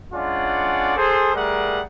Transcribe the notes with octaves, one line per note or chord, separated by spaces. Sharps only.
G#3 C#4 D4 F4 D5 F#5
G#4 A4 C5
G3 A3 G#4 A#4 F#5 A#5